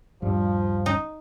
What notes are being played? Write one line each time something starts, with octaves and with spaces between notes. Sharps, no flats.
D#1 G2 F3 G3
D#4